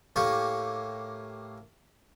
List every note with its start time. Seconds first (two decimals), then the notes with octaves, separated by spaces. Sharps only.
0.16 A2 A#3 G4 G#5 C#6